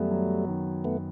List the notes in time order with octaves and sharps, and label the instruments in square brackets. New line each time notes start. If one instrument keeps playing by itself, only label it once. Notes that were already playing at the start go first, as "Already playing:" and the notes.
Already playing: [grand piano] F#2 D#3 F#3 B3 [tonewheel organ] G3 A3
[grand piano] F#3
D#3
[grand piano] F#2 [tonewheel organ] A3 B3